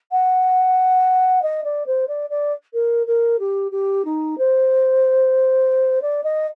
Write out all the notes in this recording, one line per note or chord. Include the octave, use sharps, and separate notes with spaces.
F#5
D#5
D5
C5
D5
D5
A#4
A#4
G4
G4
D#4
C5
D5
D#5